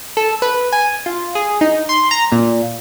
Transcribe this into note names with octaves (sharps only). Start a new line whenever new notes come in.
A4
B4
G#5
F4
G#4
D#4
C6
A#5
A#2